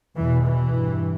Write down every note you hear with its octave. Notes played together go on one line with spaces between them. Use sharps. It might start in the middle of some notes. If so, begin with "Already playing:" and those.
E2 B2 E3
E3
G2